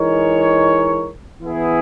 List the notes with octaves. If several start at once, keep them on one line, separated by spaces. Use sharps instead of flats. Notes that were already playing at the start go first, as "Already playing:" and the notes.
Already playing: E3 G#3 D#4 A#4 C#5
E3 B3 E4 G#4